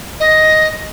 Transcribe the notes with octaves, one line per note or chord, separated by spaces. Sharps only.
D#5